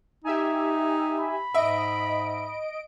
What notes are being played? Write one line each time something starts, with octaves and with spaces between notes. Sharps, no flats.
D#4 G4 E5 G#5
B5
G#2 D#5 E5 D7